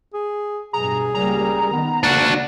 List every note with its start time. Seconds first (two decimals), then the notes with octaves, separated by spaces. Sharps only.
0.13 G#4
0.73 G2 B2 G#4 A#5
1.14 C#2 G3 A#3 A#5
1.73 D#3 B3
2.03 C#3 A#3 D4 F#4